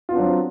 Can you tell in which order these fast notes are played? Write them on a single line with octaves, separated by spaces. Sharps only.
F4 B3 D4 F#3 C4